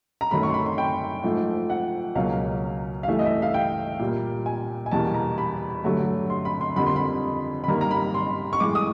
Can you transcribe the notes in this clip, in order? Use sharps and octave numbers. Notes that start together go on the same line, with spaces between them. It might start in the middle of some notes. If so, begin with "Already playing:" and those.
A#5
F#2 D#3 F#3 A3 B5
C#6
C6
B5
C6
G5
G#2 F3 A3
F#5
C#2 B2 F#3 A#3 F5
F5
G2 E3 A3 E5
D#5
E5
D#5
F5
G5
A#2 G3 A#3
G#5
G#5
E2 B2 G3 A#3 A5
A#5
B5
G2 D3 F#3 A3
C6
B5
C6
F2 D3 G3 A#3 B5
C6
B5
B5
G2 D#3 G3 A#3 A#5
A#5
B5
C6
C#6
A2 E3 G#3 D6
D#6